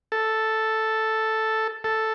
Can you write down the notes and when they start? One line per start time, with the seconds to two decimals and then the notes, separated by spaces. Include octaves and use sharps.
0.12 A4
1.84 A4